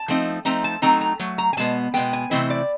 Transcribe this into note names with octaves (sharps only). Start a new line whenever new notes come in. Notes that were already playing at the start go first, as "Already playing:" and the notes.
Already playing: A5
F3 A3 C4 D#4
F3 A3 C4 D#4 A#5
A5
F#3 A3 C4 D#4 A#5
A#5
F#3 A3
A#5
G#5
B2 G#3 B3 A5
B2 G#3 B3 G5
G#5
C3 E3 A3 C4 E4 D#5
D5